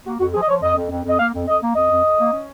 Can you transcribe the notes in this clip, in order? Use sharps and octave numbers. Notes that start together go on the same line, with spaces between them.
A#3 F#4
F2 F#4
F3 G#4
D#5
F3 C#5
F2 D#5
F2
F2
F2 D#5
A#3 F5
F2
F2 D#5
A#3
F2 D#5
F2
F2
A#3
C#4